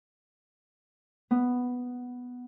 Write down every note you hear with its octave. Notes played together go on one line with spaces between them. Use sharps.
B3